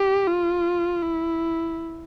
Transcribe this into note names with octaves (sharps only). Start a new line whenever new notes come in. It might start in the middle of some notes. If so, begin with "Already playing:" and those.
Already playing: G4
F4
E4